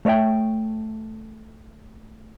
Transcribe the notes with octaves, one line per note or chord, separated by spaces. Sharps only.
A3 C#5 D5 E5 G5